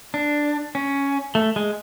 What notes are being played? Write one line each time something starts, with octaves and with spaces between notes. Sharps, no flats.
D4
C#4
A3
G#3